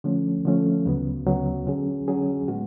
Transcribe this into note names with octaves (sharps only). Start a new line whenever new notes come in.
D3 F3 A3 C#4
D3 F3 A3 C#4
D2 C#3 F#3 B3
D2 C#3 F#3 B3
D3 F#3 C#4 G#4
D3 F#3 C#4 G#4
A2 G#3 B3 F#4